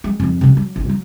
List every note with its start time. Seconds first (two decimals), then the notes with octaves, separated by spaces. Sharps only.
0.04 G#3
0.20 F2 G#2
0.41 C3 G#3
0.57 F#3
0.76 A1 E4
0.89 F#3